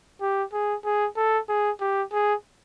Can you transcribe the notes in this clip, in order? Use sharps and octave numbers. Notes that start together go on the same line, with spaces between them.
G4
G#4
G#4
A4
G#4
G4
G#4